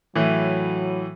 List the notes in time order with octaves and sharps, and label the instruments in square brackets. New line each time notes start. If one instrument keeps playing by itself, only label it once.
[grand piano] A2 E3 [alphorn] F#3